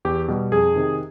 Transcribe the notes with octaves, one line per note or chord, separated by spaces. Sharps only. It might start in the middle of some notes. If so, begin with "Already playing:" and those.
E2 G4
B2 G3
F2 G#4
C3 D#3